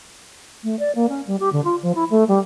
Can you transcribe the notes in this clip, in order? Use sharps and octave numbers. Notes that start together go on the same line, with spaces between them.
A3
D5
A#3
C#4
G3
G4
D3
F4
F3
E4
A3
G3